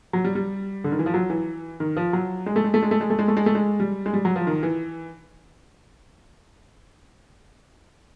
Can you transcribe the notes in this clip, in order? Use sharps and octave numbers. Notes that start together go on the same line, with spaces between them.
F#3
G3
G3
D3
D#3
E3
F3
F#3
E3
D#3
F3
F#3
G#3
A3
G#3
A3
G#3
A3
G#3
A3
G#3
A3
G#3
A3
G#3
G3
G#3
G3
F#3
F3
D#3
E3